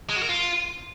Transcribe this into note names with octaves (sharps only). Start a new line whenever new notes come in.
G#3
F#4
A#4
F4